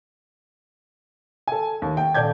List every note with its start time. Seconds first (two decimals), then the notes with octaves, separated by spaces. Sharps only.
1.48 A4 G#5
1.82 D#2
1.97 G5
2.14 D#1 A4 D5 G6 G#6